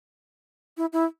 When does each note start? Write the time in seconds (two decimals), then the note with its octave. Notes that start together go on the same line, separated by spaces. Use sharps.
0.77 E4
0.93 E4